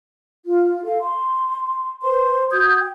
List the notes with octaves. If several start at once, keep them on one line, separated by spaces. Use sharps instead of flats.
F4
A4 F5
C6
B4 C5 C6
F#4 D#6 G6 G#6
G5